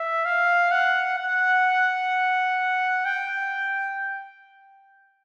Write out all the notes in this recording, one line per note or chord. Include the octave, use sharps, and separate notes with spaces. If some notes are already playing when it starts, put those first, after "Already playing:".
Already playing: E5
F5
F#5
F#5
G5